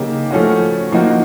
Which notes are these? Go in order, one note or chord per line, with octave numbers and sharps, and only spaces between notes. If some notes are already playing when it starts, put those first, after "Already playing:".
Already playing: C#3 F#3 A#3 D#4 G4
F3 A3 C#4 F#4
F3 A#3 D#4 F#4